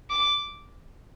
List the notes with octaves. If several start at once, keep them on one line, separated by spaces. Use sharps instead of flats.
D6